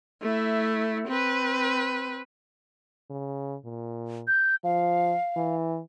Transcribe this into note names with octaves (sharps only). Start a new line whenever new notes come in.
A3 E4
C4 B4
C#3
A#2
G6
F3 F5
E3